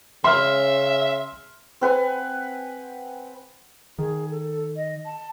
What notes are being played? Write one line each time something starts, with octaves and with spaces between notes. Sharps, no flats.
C#3 E5 C6 F6
C4 B4 F#5 G#5
D#3 G#4
A4
D#5
A5